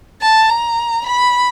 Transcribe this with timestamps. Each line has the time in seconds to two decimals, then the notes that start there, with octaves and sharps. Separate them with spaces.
0.22 A5
0.50 A#5
1.07 B5